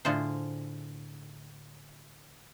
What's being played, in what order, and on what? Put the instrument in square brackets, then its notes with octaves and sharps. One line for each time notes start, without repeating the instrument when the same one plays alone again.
[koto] A2 D3 F4 G#4 C5